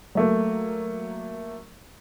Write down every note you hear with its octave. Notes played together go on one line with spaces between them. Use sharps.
F#3 A3 A#3